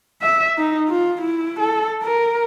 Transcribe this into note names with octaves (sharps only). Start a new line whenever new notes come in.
E5
D#4
F4
E4
A4
A#4